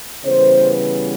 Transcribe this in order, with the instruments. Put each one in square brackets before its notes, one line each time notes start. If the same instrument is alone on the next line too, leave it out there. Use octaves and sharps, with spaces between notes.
[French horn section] C#3 E3 G3 B3 C5